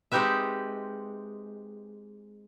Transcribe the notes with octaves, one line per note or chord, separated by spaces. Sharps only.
G#3 C4 D#4 G4 B4 E5